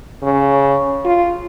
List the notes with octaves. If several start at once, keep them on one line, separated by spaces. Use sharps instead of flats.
C#3
F4